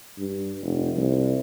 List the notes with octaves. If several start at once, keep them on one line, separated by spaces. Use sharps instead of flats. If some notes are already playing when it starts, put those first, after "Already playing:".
G2
F1
C2